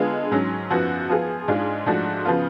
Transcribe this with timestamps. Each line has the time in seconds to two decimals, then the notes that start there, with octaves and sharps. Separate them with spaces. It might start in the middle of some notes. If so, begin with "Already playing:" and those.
Already playing: D3 G#3 B3 F4 G#4
0.31 G#2 F#3 C#4
0.70 F#2 F3 B3 F#4
1.09 F3 B3 F4 G#4
1.48 G#2 G#3 D4 F4 G#4
1.86 G#2 F3 A3 D4 F#4
2.25 C#3 F3 B3 F4